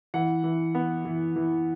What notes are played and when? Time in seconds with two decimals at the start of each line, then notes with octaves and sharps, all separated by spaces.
0.14 E3 F#5
0.44 E3
0.75 B3
1.05 E3
1.36 E3